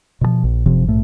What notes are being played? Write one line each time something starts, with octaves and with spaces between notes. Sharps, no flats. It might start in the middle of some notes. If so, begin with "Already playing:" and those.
B2 D3 F3
A#1
F#1 C3 F3
A#1 G#2 A3